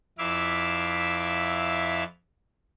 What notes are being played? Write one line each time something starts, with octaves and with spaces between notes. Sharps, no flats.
F2 E4 E5 F5 D6